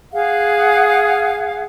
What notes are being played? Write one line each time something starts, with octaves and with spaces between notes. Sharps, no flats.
G#4 F5 F#5